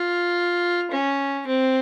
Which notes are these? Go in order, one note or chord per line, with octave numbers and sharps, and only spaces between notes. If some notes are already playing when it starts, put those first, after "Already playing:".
Already playing: F4
C#4
C4